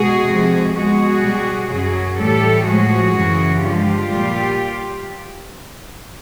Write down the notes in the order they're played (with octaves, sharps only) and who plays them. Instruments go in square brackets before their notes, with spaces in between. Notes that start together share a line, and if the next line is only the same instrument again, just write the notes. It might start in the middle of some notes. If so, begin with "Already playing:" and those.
Already playing: [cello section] B2 G#3 F#4 G#4
F2 C3 F3 G#3
B2 G#3 F#4 G#4
B2 G3
F#2 C#3 F#3 F#4 G#4
A2 E3 G3 G4 A4
A2 F3 G#3 F#4 G#4
F#2 C#3 E3
G2 D3 F3 G#3 F4 G4
A#2 G3